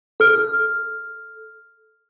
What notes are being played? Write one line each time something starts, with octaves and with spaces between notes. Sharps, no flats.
A4 F6